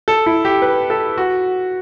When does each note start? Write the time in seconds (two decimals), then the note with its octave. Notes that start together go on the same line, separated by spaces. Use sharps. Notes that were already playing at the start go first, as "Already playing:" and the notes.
0.08 A4
0.26 E4
0.45 G4
0.62 B4
0.90 A4
1.18 F#4